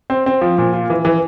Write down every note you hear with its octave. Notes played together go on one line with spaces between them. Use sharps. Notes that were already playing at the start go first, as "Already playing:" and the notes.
C4
C4
F3
A#2
F4
E3
E3